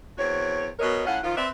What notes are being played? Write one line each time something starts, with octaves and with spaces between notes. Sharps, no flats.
E2 C4 F#4 C#5
B2 F#3 A#4 C#5 D#5
A2 C#4 F4 F#5
D#3 F3 F4
C4 B4 D5 E5